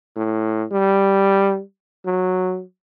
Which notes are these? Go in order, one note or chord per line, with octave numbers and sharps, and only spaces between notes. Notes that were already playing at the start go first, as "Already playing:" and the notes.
A2
G3
F#3